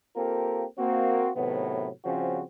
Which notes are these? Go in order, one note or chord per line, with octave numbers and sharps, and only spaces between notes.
A#3 C4 F4 G4 A4 A#4
A#3 C4 F#4
A2 C3 D#3 F#3 B3
C#3 F3 G3 C4 C#4 F#4